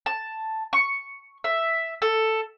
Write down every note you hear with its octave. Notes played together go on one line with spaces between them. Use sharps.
A5
C#6
E5
A4